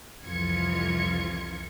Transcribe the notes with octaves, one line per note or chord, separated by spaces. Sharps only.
C2 F2 E3 F4 G#6 C#7